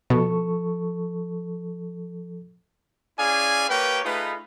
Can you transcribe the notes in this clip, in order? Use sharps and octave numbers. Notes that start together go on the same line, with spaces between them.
B2 F3 A4 C#6
C#4 E4 G#4 D5 F5 G#5
A#3 G4 A#4 B4 C#5 G5
A3 D#4 F4 G#4 B4